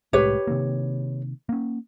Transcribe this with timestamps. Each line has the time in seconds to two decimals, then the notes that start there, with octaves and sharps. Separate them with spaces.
0.13 C2 A2 G#3 G4 B4 C#5
0.47 C3 D#3 A#3
1.49 A#3 C#4